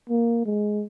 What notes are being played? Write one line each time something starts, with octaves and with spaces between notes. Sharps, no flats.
A#3
G#3